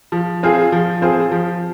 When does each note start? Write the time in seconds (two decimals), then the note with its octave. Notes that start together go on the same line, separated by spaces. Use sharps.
0.12 F3
0.43 C4 F4 G#4 C5
0.72 F3
1.02 C4 F4 G#4 C5
1.32 F3